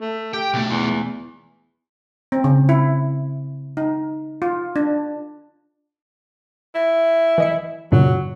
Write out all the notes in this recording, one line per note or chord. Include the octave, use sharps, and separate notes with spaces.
A3
G4 G5
B2 A3
E2
C4
C#3
E4
D#4
F4
D4
E4
E3 D#5 C#7
F#2 A#2 C#3 F#3